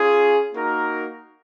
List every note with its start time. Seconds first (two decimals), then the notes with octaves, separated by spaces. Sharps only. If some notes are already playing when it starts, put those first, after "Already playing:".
Already playing: C#4 F4 G#4
0.54 A#3 D#4 F#4 A#4